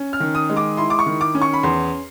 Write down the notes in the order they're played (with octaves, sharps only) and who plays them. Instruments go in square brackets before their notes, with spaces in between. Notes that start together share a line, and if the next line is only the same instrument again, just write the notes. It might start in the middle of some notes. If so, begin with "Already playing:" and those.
Already playing: [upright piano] C#4
F6
D#3
D#6
G#3
D6
E4 C6
D6
C#6
D#3
D6
C#4
C#6
B5
E2 C6